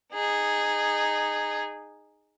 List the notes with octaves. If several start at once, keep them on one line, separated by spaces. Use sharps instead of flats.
D#4 G#4